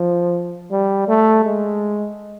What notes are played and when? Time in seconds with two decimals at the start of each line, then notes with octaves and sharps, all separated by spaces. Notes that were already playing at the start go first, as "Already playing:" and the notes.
Already playing: F3
0.71 G3
1.08 A3
1.45 G#3